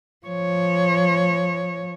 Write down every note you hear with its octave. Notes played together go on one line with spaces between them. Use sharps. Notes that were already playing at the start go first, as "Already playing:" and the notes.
F3 C#5